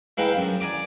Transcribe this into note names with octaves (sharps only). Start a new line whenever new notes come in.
G#3 E4 B4 F5 G5 A#5
F#2
D5 G#5 A#5 D6